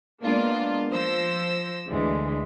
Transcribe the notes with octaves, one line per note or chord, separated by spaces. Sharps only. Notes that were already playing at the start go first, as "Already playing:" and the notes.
G#3 A#3 B3 D4 F4
F3 C5 E6 A#6
D2 D3 E3 G#3